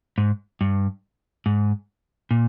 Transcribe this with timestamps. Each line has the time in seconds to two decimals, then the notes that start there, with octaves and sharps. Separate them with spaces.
0.18 G#2
0.61 G2
1.46 G#2
2.31 A#2